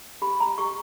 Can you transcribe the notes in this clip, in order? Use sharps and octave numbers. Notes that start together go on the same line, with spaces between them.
G4 B5
A#5
G4 C#6